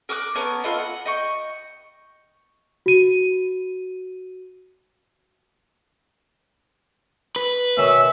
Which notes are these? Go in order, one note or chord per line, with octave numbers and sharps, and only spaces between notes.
A#4 D6 D#6 F#6
B3 C#4 A#4 A5
F4 A4 B4 D#5
F#5
D#5 G5 C#6
F#4 D#7
B4
B2 D#3 C#4 E5